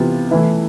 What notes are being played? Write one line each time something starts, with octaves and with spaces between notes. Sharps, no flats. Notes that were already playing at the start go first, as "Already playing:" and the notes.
Already playing: C3 E3 B3 F4
E3 A3 E4 B4